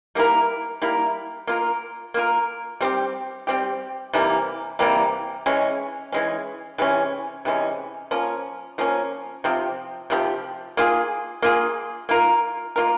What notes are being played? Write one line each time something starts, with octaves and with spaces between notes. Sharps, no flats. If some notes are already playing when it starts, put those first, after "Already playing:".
G3 A#3 E4 A#4
G3 A#3 E4 A#4
A#3 F4 A#4
A#3 F4 A#4
G3 C4 G4
G3 C4 G4
C3 E3 G3 A#3
C3 E3 G3 A#3
E3 G#3 C#4
E3 G#3 C#4
C3 E3 G#3 C#4
C3 E3 G#3 C#4
F3 A#3 C#4
F3 A#3 C#4
C3 F3 C4 G4
C3 F3 C4 G4
A#3 F4 G#4
A#3 F4 G#4
A#3 F4 A#4
A#3 F4 A#4